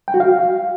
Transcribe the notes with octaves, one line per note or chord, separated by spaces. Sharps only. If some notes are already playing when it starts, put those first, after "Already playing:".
G5
F#4
F5